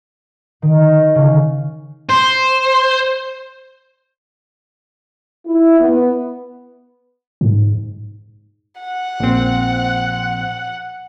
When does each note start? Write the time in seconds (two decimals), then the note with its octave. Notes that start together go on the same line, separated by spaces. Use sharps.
0.62 D#3
1.15 C#3
2.09 C5
5.46 E4
5.80 B3
7.41 G#2
8.81 F#5
9.20 A#1 C4